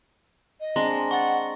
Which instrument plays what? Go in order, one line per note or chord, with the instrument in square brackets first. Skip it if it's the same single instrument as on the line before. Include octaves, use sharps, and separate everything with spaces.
[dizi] D#5
[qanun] G#3 C4 D4 [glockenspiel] A#5 C6 A#6
[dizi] F#5 [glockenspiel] C#6 A6